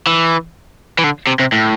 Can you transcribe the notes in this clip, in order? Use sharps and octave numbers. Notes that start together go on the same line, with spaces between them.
E3
E3
D3
C3
C3
A2